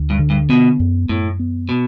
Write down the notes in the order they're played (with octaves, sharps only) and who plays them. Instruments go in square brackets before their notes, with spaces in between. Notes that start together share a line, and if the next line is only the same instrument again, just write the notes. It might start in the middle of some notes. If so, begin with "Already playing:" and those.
Already playing: [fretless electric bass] D2
[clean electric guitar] G2
[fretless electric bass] D3
[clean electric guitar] G2
[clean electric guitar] B2 [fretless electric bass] B3
[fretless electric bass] F#2
[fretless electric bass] F#2 [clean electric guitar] A2
[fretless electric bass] B3
[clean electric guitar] B2